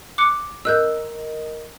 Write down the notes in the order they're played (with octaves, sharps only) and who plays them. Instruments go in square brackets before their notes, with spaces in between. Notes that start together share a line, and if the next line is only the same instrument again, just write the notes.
[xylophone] D6 F#6 C#7
[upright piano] A#4 D#5 [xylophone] E6 F#6 G6